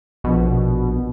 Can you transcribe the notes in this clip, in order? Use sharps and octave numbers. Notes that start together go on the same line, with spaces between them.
A#1 B2